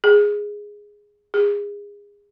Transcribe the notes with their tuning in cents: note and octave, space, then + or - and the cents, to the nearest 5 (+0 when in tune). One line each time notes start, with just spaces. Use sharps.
G#4 -5
G#4 -25